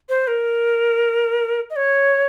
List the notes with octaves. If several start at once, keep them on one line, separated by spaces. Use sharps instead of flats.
C5
A#4
D#5
C#5